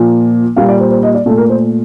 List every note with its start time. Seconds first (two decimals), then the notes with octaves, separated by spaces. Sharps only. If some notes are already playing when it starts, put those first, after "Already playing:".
Already playing: A#2 F3 A#3
0.56 A#2 G3 A#3 F5
0.69 D5
0.80 C5
0.91 C5
1.03 D#5
1.15 D5
1.26 A#2 A4
1.29 A3
1.37 A#4
1.50 C5